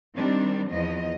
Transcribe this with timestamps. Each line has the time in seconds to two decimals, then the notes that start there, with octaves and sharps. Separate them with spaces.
0.15 D#3 G3 C4 D4
0.69 E2 F3 D#5